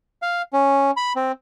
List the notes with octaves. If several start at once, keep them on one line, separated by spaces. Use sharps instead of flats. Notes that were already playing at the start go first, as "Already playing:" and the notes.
F5
C#4
B5
C4